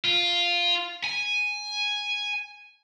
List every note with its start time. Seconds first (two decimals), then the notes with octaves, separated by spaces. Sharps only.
0.04 F4
1.04 G#5